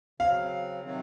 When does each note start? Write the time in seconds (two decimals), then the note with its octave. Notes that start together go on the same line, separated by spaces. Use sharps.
0.20 C#3 F#3 C4 F5
0.84 C3 D#3 F#3 C4